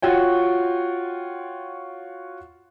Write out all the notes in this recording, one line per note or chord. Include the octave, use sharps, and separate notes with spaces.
F4 F#4 C#5 G5